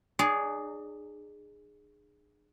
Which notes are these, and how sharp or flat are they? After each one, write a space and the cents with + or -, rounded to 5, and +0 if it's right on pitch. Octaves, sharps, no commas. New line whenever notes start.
D4 +45 G#4 +0 D5 -35